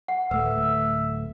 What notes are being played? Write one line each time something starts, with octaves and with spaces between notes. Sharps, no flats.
F#5
D1 A3 A4 B4 E5